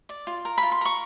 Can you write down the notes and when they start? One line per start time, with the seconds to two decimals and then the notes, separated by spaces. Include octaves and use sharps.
0.09 D5
0.27 F4
0.45 A#4
0.58 B5
0.63 F4
0.72 C6
0.81 A#4 C#6